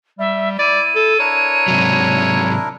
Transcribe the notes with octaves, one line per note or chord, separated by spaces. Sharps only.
G3 E5
E4 D5 D#7
A4
D4 E4 A#4 C#5
G#2 C3 F#3